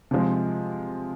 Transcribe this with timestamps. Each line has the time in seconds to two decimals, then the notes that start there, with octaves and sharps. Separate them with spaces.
0.11 C3 F3 G#3